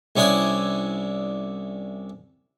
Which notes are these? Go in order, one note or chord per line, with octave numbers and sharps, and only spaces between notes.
C2 C#4 D4 E4 G#5 D#6